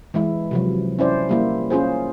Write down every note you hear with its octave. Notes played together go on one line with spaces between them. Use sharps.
E3 G#3 E4
C3 F3 F#3
C#4 E4 C5 D5
G3 A#3 E4
C#4 F4 G#4 C5